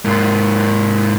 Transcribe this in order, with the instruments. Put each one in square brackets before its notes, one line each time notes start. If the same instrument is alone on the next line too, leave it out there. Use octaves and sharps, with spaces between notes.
[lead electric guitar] G#2 A#3